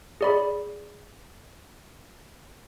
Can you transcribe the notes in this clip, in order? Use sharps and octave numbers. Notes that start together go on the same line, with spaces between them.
G#4 D5 B5